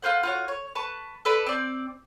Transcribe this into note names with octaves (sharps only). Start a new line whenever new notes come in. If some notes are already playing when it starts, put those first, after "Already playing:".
F4 B4 C5 F#5
F4 F#4 C#5
C#5
B4 A5 C#6
A4 B4 D5 B5
C4 D5